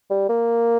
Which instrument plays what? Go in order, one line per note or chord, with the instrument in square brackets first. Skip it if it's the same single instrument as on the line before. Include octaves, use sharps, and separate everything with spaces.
[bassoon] G3
A#3